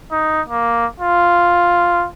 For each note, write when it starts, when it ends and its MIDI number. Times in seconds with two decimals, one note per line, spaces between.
0.11 0.42 63
0.48 0.86 58
1.00 2.07 65